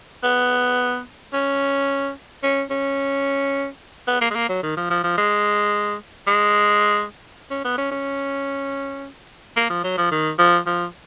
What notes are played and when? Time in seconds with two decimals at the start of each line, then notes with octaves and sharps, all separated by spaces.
0.23 B3
1.33 C#4
2.43 C#4
2.70 C#4
4.07 B3
4.21 A#3
4.31 G#3
4.35 A#3
4.49 F#3
4.63 D#3
4.77 F3
4.90 F3
5.04 F3
5.18 G#3
6.27 G#3
7.51 C#4
7.64 B3
7.78 C#4
7.91 C#4
9.56 A#3
9.70 F3
9.84 F#3
9.97 F3
10.11 D#3
10.39 F3
10.66 F3